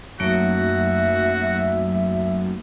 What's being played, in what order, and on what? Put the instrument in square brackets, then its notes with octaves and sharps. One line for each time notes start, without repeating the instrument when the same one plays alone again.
[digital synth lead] F#2 [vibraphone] A3 A#3 D#4 [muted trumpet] F#4 [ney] E5